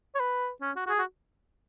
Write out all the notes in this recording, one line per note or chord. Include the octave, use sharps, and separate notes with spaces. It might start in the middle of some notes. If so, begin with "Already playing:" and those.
C#5
B4
C#4
F#4
F#4
G#4
F#4